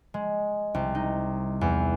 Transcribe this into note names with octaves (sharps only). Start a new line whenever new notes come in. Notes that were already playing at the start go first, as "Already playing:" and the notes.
G#3
C2
D#4
E2